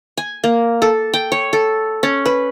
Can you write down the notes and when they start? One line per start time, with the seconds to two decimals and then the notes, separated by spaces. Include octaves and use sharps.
0.17 G#5
0.44 A#3
0.82 A4
1.14 G5
1.32 C#5
1.53 A4
2.03 C#4
2.26 B4